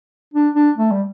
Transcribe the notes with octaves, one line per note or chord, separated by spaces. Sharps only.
D4
D4
A3
G3